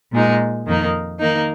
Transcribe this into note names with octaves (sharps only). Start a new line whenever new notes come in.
A#2 G#3 D#4
F2 D#3 A#3 D#4
D#3 A#3 D#4